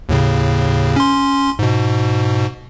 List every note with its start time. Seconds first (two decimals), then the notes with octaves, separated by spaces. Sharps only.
0.09 D#2 A2 C#3
0.96 C#4 C6
1.59 G#2 B2